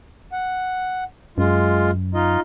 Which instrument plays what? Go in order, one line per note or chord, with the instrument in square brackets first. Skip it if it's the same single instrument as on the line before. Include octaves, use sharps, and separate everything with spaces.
[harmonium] F#5
[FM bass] F#2 [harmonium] G#3 F4
[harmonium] D#4 F4 D#5